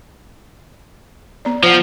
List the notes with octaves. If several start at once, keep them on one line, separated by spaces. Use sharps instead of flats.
B3 D5
F3 C5 F#5